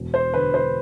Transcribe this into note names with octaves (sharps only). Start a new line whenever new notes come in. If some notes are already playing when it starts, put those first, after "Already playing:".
Already playing: E1
C5
D3 B4
C5